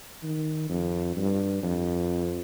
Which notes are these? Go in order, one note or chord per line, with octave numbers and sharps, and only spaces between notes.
D#3
F2
G2
F2